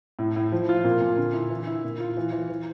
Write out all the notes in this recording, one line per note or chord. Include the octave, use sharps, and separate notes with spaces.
A2
A2
F3
F4
A#2
A#2
D3
E4
E3
E4
A#2
F4
E3
E3
E3